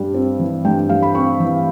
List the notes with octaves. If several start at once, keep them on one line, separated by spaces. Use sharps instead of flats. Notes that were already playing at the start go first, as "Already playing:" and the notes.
Already playing: G2 G3
C4
E3
G2 G5
G3 F5
B5
C4 C#6
E3